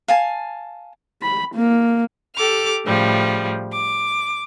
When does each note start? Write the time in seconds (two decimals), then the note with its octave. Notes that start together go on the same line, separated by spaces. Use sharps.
0.08 F5 G#5 A5
1.22 B5
1.55 A#3
2.35 G4 A4 D6 F6
2.85 A2 C#3 F3 G3
3.72 D6